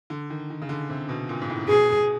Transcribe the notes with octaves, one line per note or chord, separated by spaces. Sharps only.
D3
D#3
D#3
C#3
D3
C3
B2
A#2
G#2
A2
B2 G#4
B2